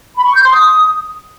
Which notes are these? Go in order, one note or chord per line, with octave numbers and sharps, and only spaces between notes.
B5
C#6
G6
C6
D#6